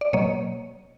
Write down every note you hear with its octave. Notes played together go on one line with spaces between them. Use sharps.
D5
B2 F#3 A#3 C#5 D#5